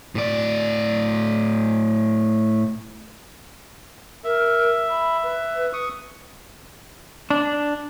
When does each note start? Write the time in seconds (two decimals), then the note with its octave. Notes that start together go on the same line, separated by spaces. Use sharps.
0.15 A2 D5
4.24 A#4 E5
4.90 B5
5.23 B4
5.73 C#6 D#6
7.30 D4